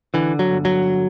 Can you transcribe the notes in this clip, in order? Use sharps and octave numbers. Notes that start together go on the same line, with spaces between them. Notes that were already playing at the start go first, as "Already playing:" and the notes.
D3 E3
F#3
G1
F#3